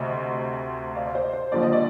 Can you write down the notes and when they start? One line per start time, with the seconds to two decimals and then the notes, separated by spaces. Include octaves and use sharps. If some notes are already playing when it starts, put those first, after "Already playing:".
Already playing: D2 C3 D#5
0.96 D5 F5
1.15 C5 D#5
1.33 C5
1.52 D#2 D3 F3 D5
1.63 D#5
1.73 D5